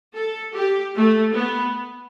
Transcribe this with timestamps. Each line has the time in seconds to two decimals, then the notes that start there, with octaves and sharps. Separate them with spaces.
0.15 A4
0.55 G4
0.95 A3
1.35 B3